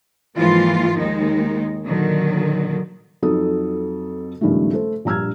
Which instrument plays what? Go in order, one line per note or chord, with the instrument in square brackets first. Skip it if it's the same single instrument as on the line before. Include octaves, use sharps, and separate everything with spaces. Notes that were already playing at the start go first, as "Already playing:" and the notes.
[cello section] G#2 E3 F3 A#3 F4
D#2 D#3 G#3 D#4
A#2 D3 D#3 F#3
[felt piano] F2 F#3 D#4 F#4 A4 D#6
C#2 G2 D#3 F3 A3
A3 A4 C5
A#1 G2 A#5 E6 F6 G#6